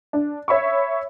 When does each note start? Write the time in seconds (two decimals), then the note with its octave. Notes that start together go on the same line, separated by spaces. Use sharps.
0.13 D4
0.48 C#5 E5 B5 C#6